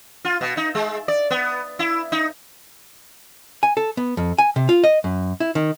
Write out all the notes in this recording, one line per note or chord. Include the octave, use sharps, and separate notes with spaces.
F4
B2
D#4
G#3
D5
B3
E4
D#4
G#5
A4
B3
F2
G#5
C3
F4
D#5
F#2
E4
D#3